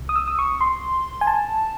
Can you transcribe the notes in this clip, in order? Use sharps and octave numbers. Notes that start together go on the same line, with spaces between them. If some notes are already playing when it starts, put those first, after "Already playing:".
Already playing: C2 C3
D#6
E6
D#6
C#6
C6
G#5
A5